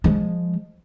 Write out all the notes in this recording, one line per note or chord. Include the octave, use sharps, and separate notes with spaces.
F3 G#3